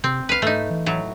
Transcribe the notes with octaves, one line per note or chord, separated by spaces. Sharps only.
C3 C4
C#2 B4 F5
G#2 A3 D#4
E3
A2 F#3